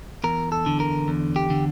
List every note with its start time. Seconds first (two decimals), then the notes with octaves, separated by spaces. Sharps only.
0.24 E2 A#4
0.52 A4
0.66 D3
0.80 A#4
1.08 E2
1.36 G4
1.50 D3